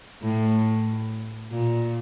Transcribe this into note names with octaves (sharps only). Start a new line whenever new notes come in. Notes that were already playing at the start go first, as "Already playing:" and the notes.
A2
A#2